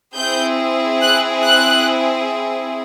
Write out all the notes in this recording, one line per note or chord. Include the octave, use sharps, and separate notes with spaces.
C4 E4 G#4 G6
F#6
F#6